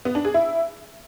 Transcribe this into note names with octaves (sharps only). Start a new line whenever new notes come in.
B3
D4
G#4
E4